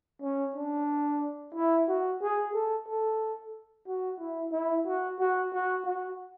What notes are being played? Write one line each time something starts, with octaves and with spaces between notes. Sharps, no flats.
C#4
D4
E4
F#4
G#4
A4
A4
F#4
E4
E4
F#4
F#4
F#4
F#4